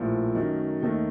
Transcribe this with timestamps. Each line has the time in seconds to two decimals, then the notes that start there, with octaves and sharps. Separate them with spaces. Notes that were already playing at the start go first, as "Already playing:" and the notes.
Already playing: A#1 A2 F3 A#3 F4
0.35 F#2 D#3 A3 D#4
0.82 D#2 D#3 A3 D#4